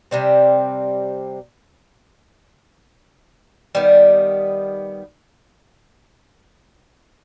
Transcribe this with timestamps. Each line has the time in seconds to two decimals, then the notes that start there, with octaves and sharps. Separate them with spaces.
0.11 C3 G3 C4
3.75 D#3 G3 B3